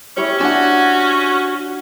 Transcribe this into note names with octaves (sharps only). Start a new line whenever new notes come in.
C#4 E4 G4 C#5
D4 F#4 F#5 G#5